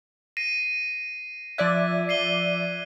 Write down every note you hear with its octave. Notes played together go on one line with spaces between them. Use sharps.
A#6 C7 D#7
F3 D5 E5 F#6 G#6 B6
C7 D#7 G7